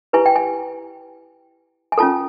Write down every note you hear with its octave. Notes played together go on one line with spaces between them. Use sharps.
E4 G4 B4 G#5
G5
G#5
G#5
C#4 F4 A4 A5